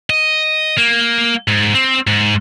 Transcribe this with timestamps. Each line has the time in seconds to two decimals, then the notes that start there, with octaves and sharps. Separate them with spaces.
0.10 D#5
0.77 A#3
1.48 G#2
1.74 C4
2.07 G#2